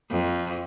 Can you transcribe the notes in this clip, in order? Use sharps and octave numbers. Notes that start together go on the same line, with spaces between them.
F2